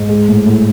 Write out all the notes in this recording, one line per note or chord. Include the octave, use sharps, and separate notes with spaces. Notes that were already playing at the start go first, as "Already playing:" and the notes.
Already playing: G#2
G#3
A2
A2